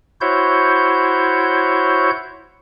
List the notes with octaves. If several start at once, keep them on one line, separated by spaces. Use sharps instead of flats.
E4 F#4 C5 C#5 G6